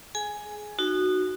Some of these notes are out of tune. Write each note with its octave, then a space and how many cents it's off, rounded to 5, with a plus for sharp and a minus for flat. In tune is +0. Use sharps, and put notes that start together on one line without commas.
G#4 +20 G#5 +0
D#4 -25 F#4 +0